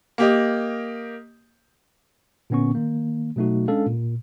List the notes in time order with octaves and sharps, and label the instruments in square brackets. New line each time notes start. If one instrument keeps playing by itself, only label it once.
[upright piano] A#3 G4 D#5
[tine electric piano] A#2 D3 B3 C#4 C#6
D#3 A#3
B2 F#3 A3 D#4 F#4
G#3 C#4 D4 A4 F5
A#2